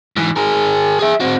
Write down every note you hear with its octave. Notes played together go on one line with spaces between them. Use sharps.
G#2 E3
G#4 A#4
G#4 E5
C4 F#4